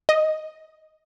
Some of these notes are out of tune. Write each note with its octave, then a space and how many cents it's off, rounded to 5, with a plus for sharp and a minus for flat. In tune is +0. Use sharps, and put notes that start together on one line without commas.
D#5 +5